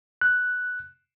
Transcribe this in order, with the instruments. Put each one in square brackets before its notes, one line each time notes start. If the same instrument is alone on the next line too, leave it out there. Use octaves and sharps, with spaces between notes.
[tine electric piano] F#6